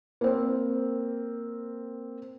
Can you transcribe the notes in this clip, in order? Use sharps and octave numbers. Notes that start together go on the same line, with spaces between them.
A#3 C4